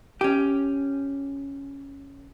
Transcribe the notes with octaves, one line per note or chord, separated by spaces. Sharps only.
C#4 G4